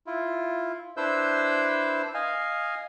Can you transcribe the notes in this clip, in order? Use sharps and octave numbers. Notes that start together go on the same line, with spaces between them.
E4 F4
D4 E4 B4 C5 E6 G6
D#5 F5 G#5